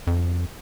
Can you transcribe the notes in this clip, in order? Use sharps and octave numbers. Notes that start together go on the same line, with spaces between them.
F2